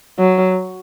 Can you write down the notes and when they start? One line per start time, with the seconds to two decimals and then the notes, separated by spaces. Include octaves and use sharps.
0.19 F#3